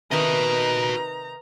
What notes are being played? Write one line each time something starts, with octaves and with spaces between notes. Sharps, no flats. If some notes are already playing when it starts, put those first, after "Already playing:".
C3 D#3 D#4 F#4 B4 D#5 A#5